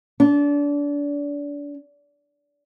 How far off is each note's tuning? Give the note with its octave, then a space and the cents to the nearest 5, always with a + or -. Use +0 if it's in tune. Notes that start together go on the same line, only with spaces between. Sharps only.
D4 -30